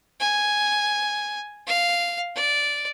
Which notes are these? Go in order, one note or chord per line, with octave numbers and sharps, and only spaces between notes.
G#5
F5
D5